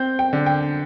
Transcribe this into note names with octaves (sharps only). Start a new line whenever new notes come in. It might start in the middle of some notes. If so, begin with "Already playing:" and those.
Already playing: C4 G6
G5
D3
G5